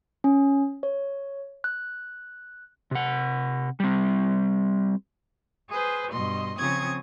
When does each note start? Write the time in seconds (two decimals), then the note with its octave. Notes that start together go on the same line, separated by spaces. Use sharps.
0.24 C#4
0.83 C#5
1.64 F#6
2.91 C3 F#5
3.80 G3 C4
5.70 G#4 B4 C5
6.12 G2 B2 D#5 C6
6.57 C#3 F3 C4 C#6 D#6 G#6